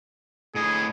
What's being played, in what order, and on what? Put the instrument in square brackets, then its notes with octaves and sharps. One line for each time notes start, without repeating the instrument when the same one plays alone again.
[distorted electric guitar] A2 D#5 [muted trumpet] G#4